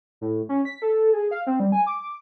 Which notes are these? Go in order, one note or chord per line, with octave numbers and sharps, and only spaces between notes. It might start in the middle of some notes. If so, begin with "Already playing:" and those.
A2
C#4
B6
A4
G#4
F5
C4
G3
G#5
D6